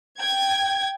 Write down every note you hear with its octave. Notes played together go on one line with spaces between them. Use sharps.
G5 G#6